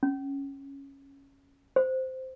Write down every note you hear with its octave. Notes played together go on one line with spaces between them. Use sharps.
C#4
C5